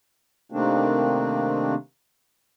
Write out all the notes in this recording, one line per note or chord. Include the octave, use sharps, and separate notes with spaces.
C3 D#3 A3 A#3 C4 D4